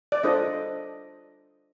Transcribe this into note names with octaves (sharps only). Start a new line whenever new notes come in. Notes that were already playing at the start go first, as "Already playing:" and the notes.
D5
D4 F4 A4 C5 D#5